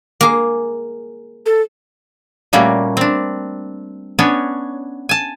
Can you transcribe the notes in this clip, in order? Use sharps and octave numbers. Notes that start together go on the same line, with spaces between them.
A#3 G#4
A4
A#2 G3 A3 A#3 C#4 F#4
C4 D4
B3 C#4 D4 C#5
G#5 A5